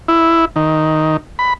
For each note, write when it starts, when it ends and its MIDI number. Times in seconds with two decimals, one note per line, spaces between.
0.08 0.45 64
0.56 1.17 51
1.39 1.53 83